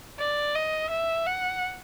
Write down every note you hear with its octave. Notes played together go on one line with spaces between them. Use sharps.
D5
D#5
E5
F#5